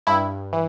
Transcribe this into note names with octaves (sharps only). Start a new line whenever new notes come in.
G2 E4
E3